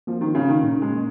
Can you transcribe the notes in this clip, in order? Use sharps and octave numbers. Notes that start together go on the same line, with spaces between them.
F3 A#3
D#3
C#3 C#4
D#3
A#2
G#3
A#3